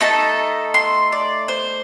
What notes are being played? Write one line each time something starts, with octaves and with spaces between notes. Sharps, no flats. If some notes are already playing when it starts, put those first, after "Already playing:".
A3 D#4 A4 A5
C6
D5
C5